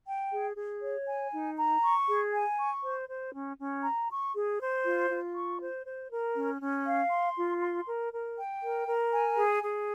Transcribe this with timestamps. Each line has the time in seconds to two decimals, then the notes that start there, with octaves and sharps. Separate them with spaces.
0.06 G5
0.31 G#4
0.57 G#4
0.82 C#5
1.06 G#5
1.31 D#4
1.57 A#5
1.82 C#6
2.07 G#4
2.33 G#5
2.58 C#6
2.83 C5
3.08 C5
3.33 C#4
3.58 C#4
3.84 A#5
4.08 C#6
4.35 G#4
4.59 C5
4.84 F4
5.10 F4
5.35 C#6
5.60 C5
5.85 C5
6.10 A#4
6.35 C#4
6.60 C#4
6.86 F5
7.11 C6
7.36 F4
7.61 C6
7.86 A#4
8.12 A#4
8.37 G5
8.62 A#4
8.87 A#4
9.12 G#5
9.37 G#4
9.63 G#4